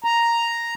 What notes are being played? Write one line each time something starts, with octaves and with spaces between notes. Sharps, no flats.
A#5